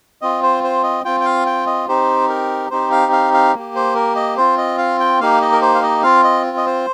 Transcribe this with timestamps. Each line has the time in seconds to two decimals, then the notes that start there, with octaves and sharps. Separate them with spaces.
0.21 C4 F4 D#5
0.43 C5
0.64 C5
0.83 D#5
1.04 C4 F4 G5
1.20 G5
1.25 F5
1.46 G5
1.66 D#5
1.88 C4 D#4 G4 C5
2.29 A#4
2.71 C4 D#4 G4 C5
2.91 F5
3.12 F5
3.34 F5
3.54 A#3 G4
3.75 C5
3.95 A#4
4.16 D#5
4.37 C4 F4 C5
4.58 D#5
4.78 F5
5.00 G5
5.20 A#3 D#4 G4 F5
5.41 D#5
5.52 A#4
5.61 C5
5.75 F5
5.83 D#5
6.03 C4 F4 F5
6.24 D#5
6.57 D#5
6.66 C5